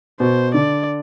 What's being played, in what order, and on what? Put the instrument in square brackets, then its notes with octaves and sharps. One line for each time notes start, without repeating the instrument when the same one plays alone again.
[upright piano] B2 [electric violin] C5
[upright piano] D3 [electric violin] D5